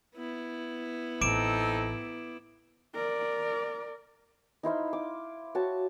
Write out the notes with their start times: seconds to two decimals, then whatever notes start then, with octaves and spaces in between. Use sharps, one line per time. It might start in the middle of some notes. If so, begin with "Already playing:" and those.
0.15 B3 E4
1.21 A1 C4 D#4 A4 D6 D7 E7
2.95 A#4 D5
4.63 D#4 E4 C5 F5
4.93 D6
5.55 F#4 C#5 A5